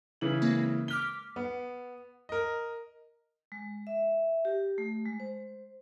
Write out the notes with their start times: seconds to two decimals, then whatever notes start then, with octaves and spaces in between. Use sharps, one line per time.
0.21 C#3 E3 F#7
0.42 G#3 A#3 C4
0.88 D6 F6 B6 G7
1.36 B3
2.29 A#4 D#5
3.52 G#3
3.87 E5
4.45 G4
4.78 A3
5.05 G#3
5.20 C5